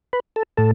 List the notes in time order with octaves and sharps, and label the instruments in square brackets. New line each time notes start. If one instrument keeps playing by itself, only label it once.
[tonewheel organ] B4
A4
A2 A4